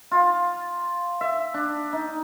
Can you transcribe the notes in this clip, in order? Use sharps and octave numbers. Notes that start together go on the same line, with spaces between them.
F4
E5
D4
D#4